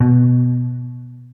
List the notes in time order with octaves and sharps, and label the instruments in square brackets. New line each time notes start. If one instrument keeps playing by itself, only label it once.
[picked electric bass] B2